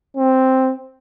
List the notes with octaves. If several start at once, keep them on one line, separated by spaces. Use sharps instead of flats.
C4